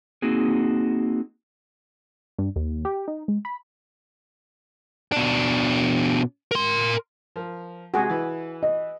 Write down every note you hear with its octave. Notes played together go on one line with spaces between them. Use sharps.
A#3 C4 D#4 F#4 G#4
G2
D#2
G4
D#4
G#3
B5
B2 D4
A#4 C6
F3 A#4
C3 G#3 F#4 G#4
E3 E4 B4
D#5